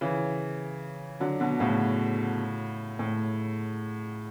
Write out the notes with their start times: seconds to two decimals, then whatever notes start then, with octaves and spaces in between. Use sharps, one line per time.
0.01 C#3 E3
1.20 D3 F#3
1.40 B2 D3
1.60 A2 C#3
2.99 A2